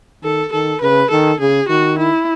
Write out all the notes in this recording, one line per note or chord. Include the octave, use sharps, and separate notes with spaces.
D#3 A4
D#3 A4
C#3 B4
D#3 A4
C#3 G#4
D#3 F#4
E4